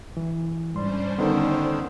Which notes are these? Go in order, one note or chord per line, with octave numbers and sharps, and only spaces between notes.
E3
G#2 G3 C#4 D4 C5 C6
D3 D#3 B3 D#4 A4